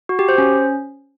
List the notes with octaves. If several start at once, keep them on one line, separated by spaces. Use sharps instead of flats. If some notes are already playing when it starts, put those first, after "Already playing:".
F#4
G4
C5
C#4